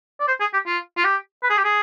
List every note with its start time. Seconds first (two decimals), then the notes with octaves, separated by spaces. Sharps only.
0.20 D5
0.28 C5
0.41 G#4
0.54 G4
0.66 F4
0.97 F4
1.05 G4
1.43 B4
1.50 G#4
1.58 G4
1.65 G#4